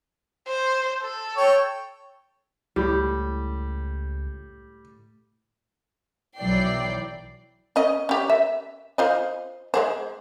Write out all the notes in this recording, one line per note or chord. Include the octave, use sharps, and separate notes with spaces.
C5
A4
C#5 G5
C#2 A2 G3
B1 E3 F#3 D5 G5 C7
C#4 D#5
C#4 G4
E5
F4 C5 D#5
G#3 G#4 C5